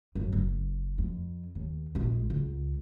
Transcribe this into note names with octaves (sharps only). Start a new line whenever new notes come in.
A1 F#2
F#1
F2
D#2
A#1 G#3
C#2